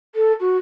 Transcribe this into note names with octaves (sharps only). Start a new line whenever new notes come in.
A4
F#4